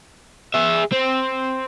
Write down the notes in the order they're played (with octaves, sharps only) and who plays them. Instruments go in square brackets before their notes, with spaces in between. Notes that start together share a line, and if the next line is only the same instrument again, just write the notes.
[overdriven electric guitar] G#4 E5
C4